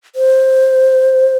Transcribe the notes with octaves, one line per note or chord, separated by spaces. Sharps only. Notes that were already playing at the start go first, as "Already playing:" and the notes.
C5